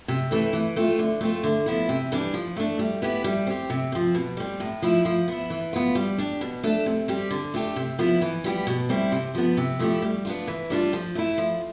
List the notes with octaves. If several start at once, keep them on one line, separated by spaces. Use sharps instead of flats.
C3
E3 A3 C4 E4
E3
A3 C4 F4
D3
A3 C4 F4
D3
F3 B3 E4
C3
E3 G3 D4
F3
A3 D4
G3
B3 E4 G4
G3
C4 G4
C3
F3 C4
B2
G3 C4
A2
F3 A3 E4
F3
B3 E4
E3
B3 F4
G3
D4 G4
B2
A3 D4
C3
G3 C4 G4
D3
A3 D4 G4
C3
F3 B3 E4
E3
G3 B3 E4 G4
B2
G3 C4 E4
C3
F3 B3
C3
F3 A3 E4 G4
G3
B3 D4 F4
E3
G3 D4 F4
F3
A3 E4
F3